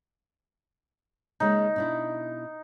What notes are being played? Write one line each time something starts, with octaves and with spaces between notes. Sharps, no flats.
C#3 G#3 A#3 D#4
B2 D4 E4